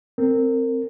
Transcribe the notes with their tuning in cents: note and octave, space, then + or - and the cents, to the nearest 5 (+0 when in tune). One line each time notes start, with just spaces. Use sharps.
C4 +0 A#4 -30